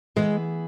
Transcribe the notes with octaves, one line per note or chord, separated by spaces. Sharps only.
E3 G#3 B3 E4 G#4